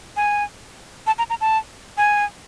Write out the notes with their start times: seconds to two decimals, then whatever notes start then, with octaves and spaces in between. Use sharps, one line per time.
0.17 G#5
1.07 A5
1.18 A#5
1.30 A#5
1.41 A5
1.97 G#5